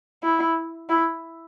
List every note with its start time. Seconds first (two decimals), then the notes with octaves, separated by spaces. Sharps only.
0.23 E4
0.89 E4